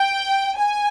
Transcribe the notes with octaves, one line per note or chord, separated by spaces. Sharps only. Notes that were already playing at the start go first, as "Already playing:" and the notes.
Already playing: G5
G#5